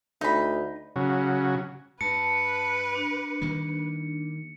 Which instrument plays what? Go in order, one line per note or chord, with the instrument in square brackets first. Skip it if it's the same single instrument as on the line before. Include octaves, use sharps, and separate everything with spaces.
[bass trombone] D2 [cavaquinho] D#4 B5
[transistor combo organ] C#3 F#3
[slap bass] G2 [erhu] B4 [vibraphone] A5 [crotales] C#7
[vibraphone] D4
[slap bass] D#3 G3 A#3